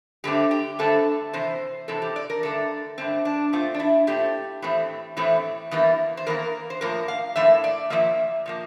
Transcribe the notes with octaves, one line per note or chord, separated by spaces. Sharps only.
G2 D3 A3 C4 G4
G4
G2 D3 A3 C4 A4
C3 E3 C4 C5
C3 E3 C4 A4
G4
D5
A#4
G2 D3 A3 A4
G2 D3 A3 C4
D4
A#2 A3 C4 F4
D4
E4
A#2 A3 C4 G4
A2 E3 A3 C4
A2 E3 A3 C4
E2 E3 G3 A#3
C5
E2 E3 A#3 A#4
C5
A2 F3 A#3 A#4
F5
A2 F3 A#3 E5
D5
A#2 F3 A#3 E5
A#2 F3 A#3